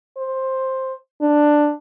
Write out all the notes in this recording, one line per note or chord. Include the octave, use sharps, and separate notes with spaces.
C5
D4